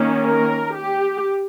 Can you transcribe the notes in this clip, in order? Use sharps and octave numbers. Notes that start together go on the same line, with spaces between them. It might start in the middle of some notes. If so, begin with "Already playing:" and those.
Already playing: D#3 A#3 C#4
A#4
G4